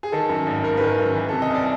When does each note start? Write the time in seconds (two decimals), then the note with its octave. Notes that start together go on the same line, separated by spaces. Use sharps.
0.03 G#4
0.12 D#3 A4
0.29 F#2
0.47 G#1
0.64 G#1 A#4
0.77 D#3 B4
0.89 A#4
0.98 F#2
1.16 E3
1.29 C3 A4
1.42 D#5
1.50 C2 D5